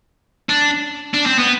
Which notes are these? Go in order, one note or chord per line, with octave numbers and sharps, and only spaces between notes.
D4
D4
C4
B3